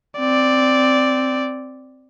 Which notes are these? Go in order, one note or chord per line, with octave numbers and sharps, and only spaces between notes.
C4 D5